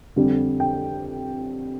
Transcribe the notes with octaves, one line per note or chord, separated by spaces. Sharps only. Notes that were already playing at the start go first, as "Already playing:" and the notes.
F2 D3 G3
G5